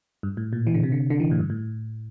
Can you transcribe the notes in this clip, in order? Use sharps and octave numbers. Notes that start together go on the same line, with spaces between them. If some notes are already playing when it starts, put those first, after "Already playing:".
G2
A2
A#2
E3
D3
C3
D3
D3
E3
A2
G2
A2